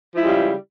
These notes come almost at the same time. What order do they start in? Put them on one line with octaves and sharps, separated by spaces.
F3 E4 G#3 G3 C#3